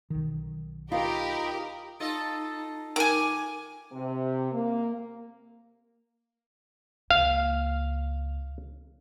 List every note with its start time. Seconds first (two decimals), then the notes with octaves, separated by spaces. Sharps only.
0.10 B1 D#3
0.92 D#4 F4 G4 A#4 D#5 B5
2.00 D#4 F4 A4 D#5
2.96 D#3 G#5 D6
3.92 C3
4.52 A#3
7.11 C#2 A#3 F5